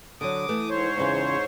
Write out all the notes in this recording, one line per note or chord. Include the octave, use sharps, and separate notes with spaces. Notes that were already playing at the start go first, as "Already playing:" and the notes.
D3 F#3 D6 D#6
E3 A3
G#2 C5 C#5
E2 C#3 F4